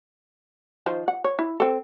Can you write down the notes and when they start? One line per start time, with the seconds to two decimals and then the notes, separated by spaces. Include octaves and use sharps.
0.86 D#3 F3 C5
1.08 F#5
1.24 C#5
1.39 E4
1.60 C4 A4